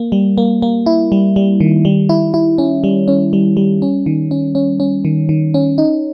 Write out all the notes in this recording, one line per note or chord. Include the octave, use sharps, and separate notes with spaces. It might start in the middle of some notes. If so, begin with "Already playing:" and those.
Already playing: A#3
G3
A#3
A#3
E4
G3
G3
D#3
G3
E4
E4
C#4
G3
C#4
G3
G3
C#4
D#3
C#4
C#4
C#4
D#3
D#3
C#4
D#4